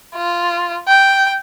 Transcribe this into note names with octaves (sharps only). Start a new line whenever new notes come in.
F4
G5